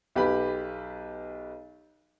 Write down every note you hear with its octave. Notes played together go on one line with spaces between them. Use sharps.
B1 G4 B4 B5